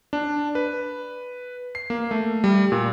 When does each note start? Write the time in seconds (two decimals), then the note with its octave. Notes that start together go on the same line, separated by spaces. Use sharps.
0.13 D4
0.55 B4
1.75 C7
1.90 A#3
2.11 A3
2.44 G3
2.72 A#2